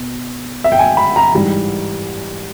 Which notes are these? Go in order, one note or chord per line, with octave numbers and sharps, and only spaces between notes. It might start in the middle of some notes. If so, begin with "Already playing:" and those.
Already playing: B2
E5
G5
G#5
B5
A#5
G#2 E3 G3 A#5